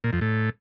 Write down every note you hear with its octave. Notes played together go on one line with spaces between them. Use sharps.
A#2
F2
A2